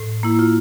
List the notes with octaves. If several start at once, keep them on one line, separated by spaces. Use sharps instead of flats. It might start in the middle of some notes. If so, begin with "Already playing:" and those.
Already playing: A2
A#3 E4
F4